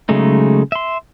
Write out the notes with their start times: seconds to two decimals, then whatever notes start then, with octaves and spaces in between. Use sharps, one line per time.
0.09 C#3 F#3 G#3 A3 D#4
0.72 E5 C6